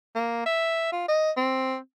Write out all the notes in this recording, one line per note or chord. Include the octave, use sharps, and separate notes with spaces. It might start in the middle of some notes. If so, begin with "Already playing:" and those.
A#3
E5
F4
D#5
C4